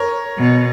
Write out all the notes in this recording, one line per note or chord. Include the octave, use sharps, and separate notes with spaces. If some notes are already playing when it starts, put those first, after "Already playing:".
Already playing: A#4 C#5
B2